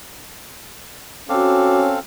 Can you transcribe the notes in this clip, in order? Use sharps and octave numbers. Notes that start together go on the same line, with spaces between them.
C4 C#4 F#4 A4 F5 D6